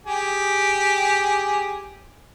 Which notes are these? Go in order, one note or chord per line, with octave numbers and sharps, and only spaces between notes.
G4 G#4